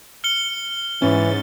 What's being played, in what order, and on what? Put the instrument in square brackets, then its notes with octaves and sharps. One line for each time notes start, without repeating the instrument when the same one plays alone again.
[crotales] F6 C#7 G7
[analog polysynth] G#2 A6 [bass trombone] E3 [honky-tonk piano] C#4